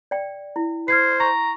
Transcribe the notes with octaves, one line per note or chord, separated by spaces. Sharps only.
D5 G5
E4
C5 F6 G#6 C7
A#5 C#6